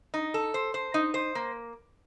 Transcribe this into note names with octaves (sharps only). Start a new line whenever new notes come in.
D#4
A4
C5
C5
D#4
C5
A#3